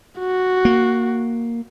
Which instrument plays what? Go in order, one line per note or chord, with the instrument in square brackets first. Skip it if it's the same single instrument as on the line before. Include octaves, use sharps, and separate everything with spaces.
[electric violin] F#4
[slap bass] A#3